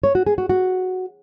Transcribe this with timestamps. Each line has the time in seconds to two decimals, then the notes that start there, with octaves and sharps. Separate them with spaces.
0.04 C#5
0.15 F#4
0.26 G#4
0.38 F#4
0.49 F#4